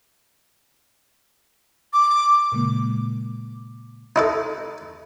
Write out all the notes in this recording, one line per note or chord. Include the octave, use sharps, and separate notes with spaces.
D6
A#2 C#3 G#3 A#3
D#4 E4 A4